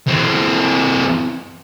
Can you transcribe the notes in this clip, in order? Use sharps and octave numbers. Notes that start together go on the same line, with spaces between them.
E3 C4